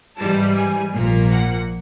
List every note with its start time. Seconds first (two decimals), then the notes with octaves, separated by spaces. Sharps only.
0.18 G#2 E3 G3 A5
0.56 G#5
0.93 A#1 A#2 F3 A#3
1.32 F#5